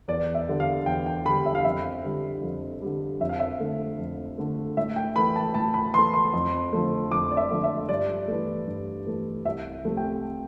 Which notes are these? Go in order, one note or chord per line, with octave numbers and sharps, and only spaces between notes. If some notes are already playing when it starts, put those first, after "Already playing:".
E2 D5
E5
D3 G3
F5
E2 G5
G5
D3 G3 B5
E5
F5
F2 E5
D3 G3
F2
D3 G3
F2 E5
F5
E5
D3 A3
F2
D3 A3
A2 E5
G5
E3 A3 B5
A5
A2 A5
B5
E3 A3 C6
C6
F2
D3 F3 A3
F2 D6
D5
E5
D3 F3 A3
E5
G2 D5
E3 A3
G2
E3 A3
C2 E5
C3 F3 A3
G5